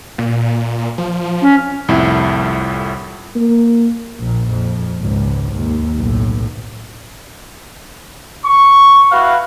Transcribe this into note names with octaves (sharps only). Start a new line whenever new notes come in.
A#2
F3
C#4
C2 F2 A2 E4
A#3
A#1 A#2
F2
G#1 C#2
D#2
B1 A2
C#6
E4 F#4 B4 F5